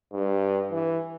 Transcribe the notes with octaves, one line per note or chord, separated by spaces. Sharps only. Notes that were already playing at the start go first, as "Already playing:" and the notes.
G2
E3